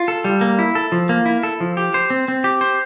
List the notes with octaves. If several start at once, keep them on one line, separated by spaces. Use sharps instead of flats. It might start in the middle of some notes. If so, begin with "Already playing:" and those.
Already playing: F4
A4
G3
A#3
E4
A4
F3
A#3
E4
A4
F3
G4
C5
C4
C4
G4
C5